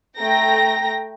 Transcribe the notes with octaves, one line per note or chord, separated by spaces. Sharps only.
A3 G5 A#5 A#6